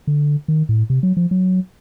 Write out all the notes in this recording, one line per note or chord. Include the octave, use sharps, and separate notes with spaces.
D3
D#3
A2
C3
F#3
F3
F#3